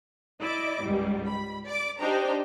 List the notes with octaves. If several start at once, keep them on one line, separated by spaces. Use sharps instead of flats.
E4 D5 D#5 D6
C#2 G#2 G3
B5
D5 D6
D4 D#4 G4 C5 G5 A#5